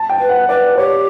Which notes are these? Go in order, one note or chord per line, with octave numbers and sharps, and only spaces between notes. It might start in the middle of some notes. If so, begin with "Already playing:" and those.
Already playing: A5
G5
B4
F#5
B4 D5
G4 C#5